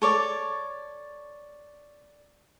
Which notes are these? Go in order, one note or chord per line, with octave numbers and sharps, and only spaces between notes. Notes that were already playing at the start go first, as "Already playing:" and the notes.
A4 C#5 D5 D6